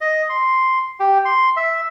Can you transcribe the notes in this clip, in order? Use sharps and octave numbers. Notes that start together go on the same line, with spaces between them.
D#5
C6
G4
C6
E5